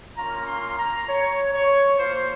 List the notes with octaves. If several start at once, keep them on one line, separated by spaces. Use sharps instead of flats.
A#3 C#4 F4 A#5
C6
A#5
C#5
C#5
A#3 F4 C5